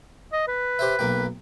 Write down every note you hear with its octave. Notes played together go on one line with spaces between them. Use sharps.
D#5
B4
G4 C5 E5
B1 A#3 G5